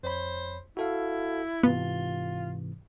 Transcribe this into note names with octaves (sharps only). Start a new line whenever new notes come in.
F2 C5 C#5 B5
E4 F#4 A4 F5
G#2 C3 E3 B3 F4